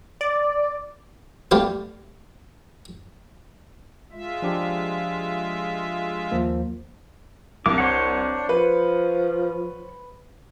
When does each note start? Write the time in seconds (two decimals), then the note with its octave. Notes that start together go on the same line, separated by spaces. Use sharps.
0.21 D5
1.51 G3 A3 B3 G4 F5
4.12 G#3 F4 E5
4.42 F3 D4 G4
6.31 D#2 F3 A#3
7.66 C2 D4 D6
7.78 C5 C#5 F#5
8.49 F3 B4